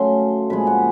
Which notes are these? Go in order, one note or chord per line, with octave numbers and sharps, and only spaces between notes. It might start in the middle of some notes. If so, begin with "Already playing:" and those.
Already playing: C#3 F#3 A3 C#4 C6
A#2 F3 G#3 B5
F#5